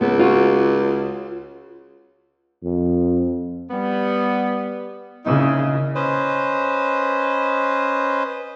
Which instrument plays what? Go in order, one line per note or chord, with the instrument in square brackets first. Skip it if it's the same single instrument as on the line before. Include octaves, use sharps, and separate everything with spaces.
[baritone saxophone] C#2 [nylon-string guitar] B3
[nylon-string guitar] F4 F#4
[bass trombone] F2
[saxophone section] G3 B3
[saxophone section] A#2 D#4 E4 [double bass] C#3
[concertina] C#4 B4 C5 D#5